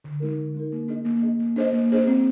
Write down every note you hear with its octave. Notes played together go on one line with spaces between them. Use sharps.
D3
G#3 D#4 A#4
D3
G#3 D#4 A#4
A#3
D4 G#4 D#5
A#3
D4 G#4 D#5
A#3
D4 G#4 C5 D#5
A#3
D4 G#4 C5 D#5
C4